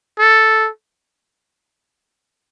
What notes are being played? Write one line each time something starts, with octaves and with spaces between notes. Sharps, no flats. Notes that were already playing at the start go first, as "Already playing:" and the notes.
A4